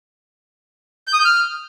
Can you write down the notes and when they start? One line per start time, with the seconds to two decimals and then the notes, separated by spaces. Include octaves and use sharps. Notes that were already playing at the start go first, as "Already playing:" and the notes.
1.08 G6
1.13 D#6
1.19 G6
1.25 F6